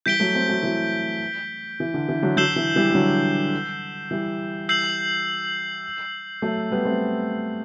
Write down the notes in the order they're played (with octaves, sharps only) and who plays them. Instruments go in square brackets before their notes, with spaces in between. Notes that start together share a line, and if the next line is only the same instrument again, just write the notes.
[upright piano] E3 G3 [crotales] G6 B6 D7 G7
[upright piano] F#3 A3
A3 C4
F#3 A3
E3
E3
D3
E3
D3 F#3
[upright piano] D3 F#3 [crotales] E6 G6 C7 E7 G7
[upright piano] E3
E3 G3
G3
D3 F#3
E3 G3
[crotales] E6 G6 C7 F#7
[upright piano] F#3 A3
G3 B3
A3 C4